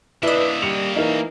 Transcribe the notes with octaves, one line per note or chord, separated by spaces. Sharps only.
A#3 D4 E4 B4 D#5 E5
G3 C#7 F7
E3 D#4 A#4